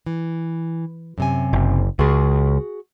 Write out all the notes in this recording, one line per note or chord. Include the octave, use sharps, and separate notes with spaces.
E3
F#2 C3 G#5
F#1
C#2 F#4 G#4